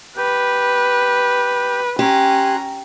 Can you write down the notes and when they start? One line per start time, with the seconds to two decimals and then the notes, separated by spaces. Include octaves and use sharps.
0.17 G4 B4
1.99 C#4 G4 G#5 A#5 C6 F#6